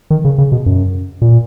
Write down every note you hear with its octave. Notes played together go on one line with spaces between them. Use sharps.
D#3
C#3
C#3
B2
F#2
A#2